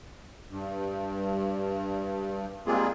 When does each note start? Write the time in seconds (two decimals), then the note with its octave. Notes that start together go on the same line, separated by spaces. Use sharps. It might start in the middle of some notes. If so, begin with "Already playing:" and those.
0.51 G2
2.66 G3 G#3 A#3 C4 F4 G#4